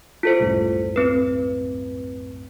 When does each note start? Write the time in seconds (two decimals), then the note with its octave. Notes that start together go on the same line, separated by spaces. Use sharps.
0.23 F4 A4 C5
0.40 C2 F#2 A2
0.96 C4 B4